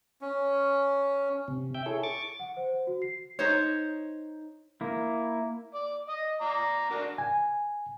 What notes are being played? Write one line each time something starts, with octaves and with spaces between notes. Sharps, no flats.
C#4
C3
E5 G5 G6
E4 G#4 A4 C#5
C#6 D6 A6
F#5
C5
F#4
C7
D#4 C5 C#5
A#3 E4
D5
D#5
D5 A#5
D4 F#4 A#4
G#5